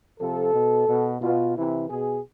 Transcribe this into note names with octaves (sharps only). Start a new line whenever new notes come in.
C3 F3 A4
B2
B2
B2 F4
C3 E3 E4
B2 G#4